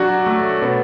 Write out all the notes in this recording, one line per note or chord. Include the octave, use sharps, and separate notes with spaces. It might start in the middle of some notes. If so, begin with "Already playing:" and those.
Already playing: F#3 D4 F#4
A3
B2